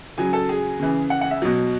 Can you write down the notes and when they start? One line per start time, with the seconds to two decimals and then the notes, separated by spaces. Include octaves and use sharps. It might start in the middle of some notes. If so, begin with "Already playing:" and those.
0.18 C#3 F#3 G#4 G#5
0.33 A4 A5
0.49 G#4 G#5
0.80 C#3 E3
1.10 F#5
1.21 F#5
1.31 E5
1.42 B2 F#3